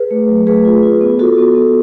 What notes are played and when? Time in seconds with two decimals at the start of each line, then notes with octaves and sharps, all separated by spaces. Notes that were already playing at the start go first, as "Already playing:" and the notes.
Already playing: G#4 B4
0.11 A3
0.29 F#3
0.47 A3 G#4 B4
0.65 F4
0.83 F4
1.01 B3
1.19 F4 F#4 A4
1.38 B3
1.55 B3